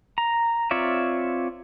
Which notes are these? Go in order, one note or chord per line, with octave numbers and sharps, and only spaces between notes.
A#5
C4 F4 C#5 D5 E5